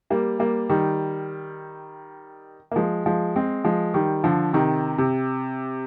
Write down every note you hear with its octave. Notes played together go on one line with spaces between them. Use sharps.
G3 A#3
G3 A#3
D#3 G3
A#3
F3 G#3
F3 G#3
G#3 C4
F3 G#3
D#3 G3
D3 F3
C3 D#3
C3